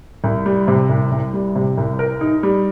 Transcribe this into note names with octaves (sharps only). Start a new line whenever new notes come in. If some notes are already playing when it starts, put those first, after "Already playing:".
C2
G3
C3
C2
C2
G3
C3
C2
A#4
D#4
G3